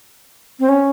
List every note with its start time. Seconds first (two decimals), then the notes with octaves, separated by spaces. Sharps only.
0.60 C4
0.69 C#4